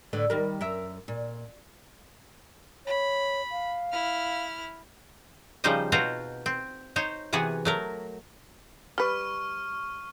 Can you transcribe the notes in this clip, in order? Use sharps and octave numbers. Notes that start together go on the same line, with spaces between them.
A2 D3 B4
D#3 G3 A#4
F#2 A#4 E5
A#2
C#5 B5
F5
E4 F6
C#3 F3 G3 D#4 C5 D#5
B2 C4 F4 F#4 C5 A#5
C4
D#4 C5 C#5
C3 E3 B3 F#4 G#4
F#3 A3 A#4
G3 B4 C#6 F6